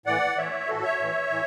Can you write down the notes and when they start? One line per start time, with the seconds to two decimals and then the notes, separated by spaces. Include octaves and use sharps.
0.06 A2 E3 D5 F#5
0.37 A2 E3 C#5 E5
0.67 A2 E3 F#4 A4
0.83 C#5 E5
0.99 A2 E3
1.30 A2 E3